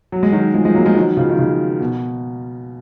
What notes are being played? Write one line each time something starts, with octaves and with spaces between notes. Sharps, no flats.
F#3
G#3
D#3 F#3
F3 G#3
F3 G#3
F#3 A#3
F3 G#3
D#3 F#3
C#3 F3
D#3
C#3
B2